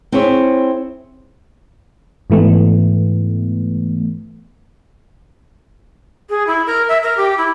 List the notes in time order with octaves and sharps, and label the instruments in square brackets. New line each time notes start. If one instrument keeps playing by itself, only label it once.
[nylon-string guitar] C4 E4 G#4 C#5 E5
[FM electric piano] G#2 E3 A3 B3
[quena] G#4
E4
A#4
E5
A#4
G4
E4